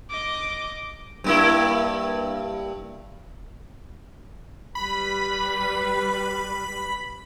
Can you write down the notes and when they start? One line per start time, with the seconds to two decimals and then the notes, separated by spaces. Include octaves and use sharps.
0.10 D#5 D6
1.24 G2 A#3 E4
4.75 G3 B4 B5